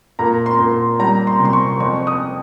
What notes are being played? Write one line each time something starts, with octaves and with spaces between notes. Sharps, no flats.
A#2 A#5
C6
A#2
G3 A#5
C6
C3
C6
C#6
F2 C#6
D#6